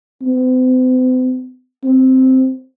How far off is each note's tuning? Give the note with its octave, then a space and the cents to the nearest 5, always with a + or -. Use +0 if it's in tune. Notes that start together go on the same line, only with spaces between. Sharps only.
C4 -45
C4 -5